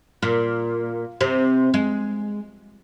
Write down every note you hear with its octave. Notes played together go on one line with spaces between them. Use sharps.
A#2
C3
G#3